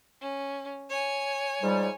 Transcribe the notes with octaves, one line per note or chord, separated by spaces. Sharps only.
C#4
C#5 G#5
G#2 F3 G3